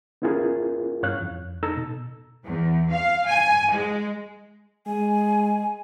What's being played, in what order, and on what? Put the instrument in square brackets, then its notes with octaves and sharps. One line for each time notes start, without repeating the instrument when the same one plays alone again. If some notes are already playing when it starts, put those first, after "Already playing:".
[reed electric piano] B3 C#4 E4 F4 G#4 A#4
G2 C#5 F5 F#6
F2
D#4 A4 A#5 E6
B2
[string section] E2
F5
G#5
G#3
[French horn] G#3 [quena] G#5